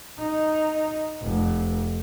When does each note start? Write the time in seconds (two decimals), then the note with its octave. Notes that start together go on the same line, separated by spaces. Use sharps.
0.19 D#4
1.21 F1